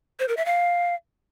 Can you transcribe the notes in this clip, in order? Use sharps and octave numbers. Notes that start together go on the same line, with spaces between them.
C5
A#4
E5
F5